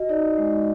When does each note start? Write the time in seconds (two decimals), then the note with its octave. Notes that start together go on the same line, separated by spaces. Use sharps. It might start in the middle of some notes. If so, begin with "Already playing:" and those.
Already playing: F#4 D#5
0.09 D#4 D5
0.38 G#3